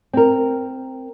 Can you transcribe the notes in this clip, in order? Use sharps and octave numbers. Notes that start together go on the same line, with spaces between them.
C4 A#4